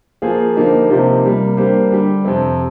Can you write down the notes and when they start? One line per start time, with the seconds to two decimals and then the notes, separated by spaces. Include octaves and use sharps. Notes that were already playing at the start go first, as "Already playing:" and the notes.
0.22 F3 A#3 F4 G#4 C5
0.56 D3 F3 A#3 D#4 G4
0.90 C3 F3 A#3 D#4 G4
1.24 C3 G3 A#3
1.57 G3 A#3 D4 G4 C5
1.91 D3 G3 D4 G4
2.25 F2 C3 F3 C4